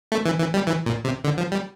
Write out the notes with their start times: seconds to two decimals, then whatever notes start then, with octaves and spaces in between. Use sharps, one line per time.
0.12 A3
0.25 E3
0.39 E3
0.54 G3
0.67 E3
0.86 A#2
1.05 C3
1.24 D3
1.37 F3
1.52 G3